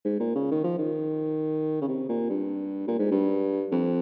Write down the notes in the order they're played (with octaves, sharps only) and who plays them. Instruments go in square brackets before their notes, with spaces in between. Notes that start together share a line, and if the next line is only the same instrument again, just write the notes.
[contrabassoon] G#2
A#2
C#3
D#3
F3
D#3
C#3
C3
A#2
G2
A#2
G#2
G2
F2